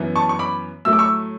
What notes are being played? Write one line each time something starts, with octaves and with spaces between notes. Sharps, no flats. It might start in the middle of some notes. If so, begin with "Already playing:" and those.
Already playing: F#2 E3 B3
A5 C#6
C#6
B5 D6
A2 F#3 A3 E6
D6
C#6 E6